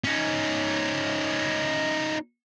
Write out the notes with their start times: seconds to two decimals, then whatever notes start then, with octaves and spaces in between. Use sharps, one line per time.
0.04 C#4 D#4